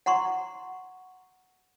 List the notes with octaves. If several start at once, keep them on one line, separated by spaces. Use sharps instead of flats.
F#5 A#5 C6 C#6